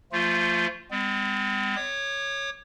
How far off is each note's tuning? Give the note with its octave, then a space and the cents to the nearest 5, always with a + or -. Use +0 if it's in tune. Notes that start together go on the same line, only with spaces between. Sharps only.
F3 -15 A3 +30 F4 +0
G#3 -45 C4 -45
C#5 +0 D6 +40